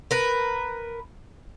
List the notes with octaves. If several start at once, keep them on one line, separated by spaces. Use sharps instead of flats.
A#4 B4